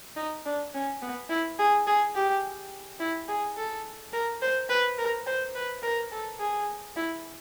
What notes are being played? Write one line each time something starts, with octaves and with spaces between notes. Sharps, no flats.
D#4
D4
C#4
B3
E4
G#4
G#4
G4
E4
G#4
A4
A#4
C5
B4
A#4
C5
B4
A#4
A4
G#4
E4